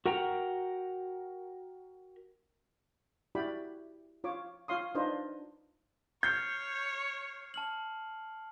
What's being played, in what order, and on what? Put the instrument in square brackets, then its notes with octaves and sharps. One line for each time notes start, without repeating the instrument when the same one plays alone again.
[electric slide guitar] F#4 A#4 F#5 G5 A#5
[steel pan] E4 F#4 G4 D5 G5 B5
F4 C#5 D6
F4 C#5 F5 C6 D#6
D4 D#4 F4 B4 C5 D#5
[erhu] C#5 [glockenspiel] F6 C7 C#7 [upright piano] G6
[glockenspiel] A5 F6 F#7